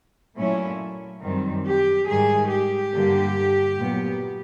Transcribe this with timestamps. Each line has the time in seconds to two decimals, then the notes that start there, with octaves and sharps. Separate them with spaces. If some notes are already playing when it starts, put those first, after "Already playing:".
0.37 A#2 F#3 A3 C#4 E4
1.22 F#2 D#3 G3 C4
1.66 G4
2.08 G#2 D#3 G3 G#4
2.50 G4
2.93 G2 D3 G3 A#3
3.79 A#2 F#3 B3